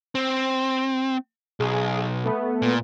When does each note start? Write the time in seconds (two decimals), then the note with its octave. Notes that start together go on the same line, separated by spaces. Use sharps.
0.15 C4
1.60 B1 G#4
2.24 A3 B3
2.62 A#2